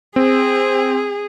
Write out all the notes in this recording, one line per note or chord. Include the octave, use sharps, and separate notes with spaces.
C4 G#4